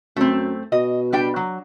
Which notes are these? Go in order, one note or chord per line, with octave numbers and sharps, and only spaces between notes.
F#2 A3 C4
B2 D#5
G3 D4 G5
F#3